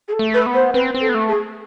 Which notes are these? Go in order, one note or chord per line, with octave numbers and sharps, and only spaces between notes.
G#4
A4
A3
B4
B3
C5
C4 B4
C4
A4
B3
A3
G#4